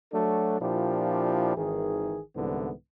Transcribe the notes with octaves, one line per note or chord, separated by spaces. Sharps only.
F#3 A3 D4 F#4 A4
A#2 F3 D4 E4 G4
G#1 D#3 E3 G#4
C2 G#2 D3 E3 B3